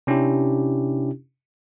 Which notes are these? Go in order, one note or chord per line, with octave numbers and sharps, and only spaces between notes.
C3 C#4 D4 E4 G4